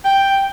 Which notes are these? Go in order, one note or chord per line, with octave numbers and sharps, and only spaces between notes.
G5